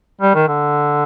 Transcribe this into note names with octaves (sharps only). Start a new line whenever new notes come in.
G3
D#3
D3